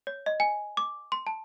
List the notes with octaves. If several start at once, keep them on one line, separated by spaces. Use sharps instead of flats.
C#5
D#5
G#5
D6
C6
A5